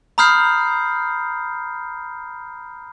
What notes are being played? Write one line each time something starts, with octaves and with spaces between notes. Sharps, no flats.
A#5 B5 D#6 F6 G6 C7